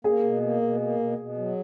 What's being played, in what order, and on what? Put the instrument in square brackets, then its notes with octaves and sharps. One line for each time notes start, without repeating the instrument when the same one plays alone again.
[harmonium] A#3 [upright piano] G#4
[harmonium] B2
A#3
B2
A#3
B2
B2
F#3